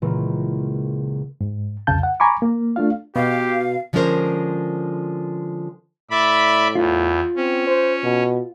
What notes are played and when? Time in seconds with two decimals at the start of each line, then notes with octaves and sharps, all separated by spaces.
0.02 C#2 A#2 C#3 E3 A#3
1.41 G#2
1.87 C2 F2 C#3 F5 A5 G6
2.03 F#5
2.20 G#5 A#5 B5 C#6 D6
2.42 A#3
2.76 A3 D4 F4 F5
3.16 B2 G4 F5
3.93 D3 F3 G#3 C#4 A#4 C5
6.11 A2 D5 E5 B5
6.75 E2 F4
7.36 C4 C#4
7.67 C5
8.03 B2